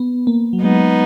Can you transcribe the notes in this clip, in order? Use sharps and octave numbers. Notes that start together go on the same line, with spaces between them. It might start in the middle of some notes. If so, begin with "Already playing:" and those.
Already playing: B3
A#3
F#3
G#3 B3 D#4